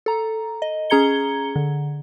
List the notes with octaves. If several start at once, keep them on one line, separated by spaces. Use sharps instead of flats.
A4 A#5
D#5
C#4 G#4 A#5 G#6 C#7 G7
D3